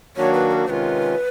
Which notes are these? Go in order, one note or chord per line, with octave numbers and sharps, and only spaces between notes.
D#3 F#3 A#3 D4 F#4 C#5
B4
A#4
C3 D#3 G#3 C#4 F4 B4 C5